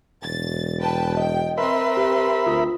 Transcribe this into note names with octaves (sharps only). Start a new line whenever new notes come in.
E1 A6
B4 G5 A5
D#5 G5
C4 A#4 B4 E5 B5 C6
G4
D2 F4 D#6